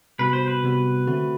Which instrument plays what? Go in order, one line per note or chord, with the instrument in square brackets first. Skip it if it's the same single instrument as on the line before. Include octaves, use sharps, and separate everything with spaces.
[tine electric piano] C3 G3 B3 F#4 [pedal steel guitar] B4
[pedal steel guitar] C5
B4
[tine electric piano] C3 G3 B3 F#4
D3 A3 C4 F#4